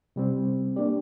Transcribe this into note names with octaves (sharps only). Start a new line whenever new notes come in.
C3 G3 C4
A#3 D4 G4 D5